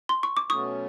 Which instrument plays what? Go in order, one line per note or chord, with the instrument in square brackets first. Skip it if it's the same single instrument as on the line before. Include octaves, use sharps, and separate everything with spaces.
[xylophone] C6
C#6
D6
[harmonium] B2 F#3 A3 C#4 [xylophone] C#6 D#6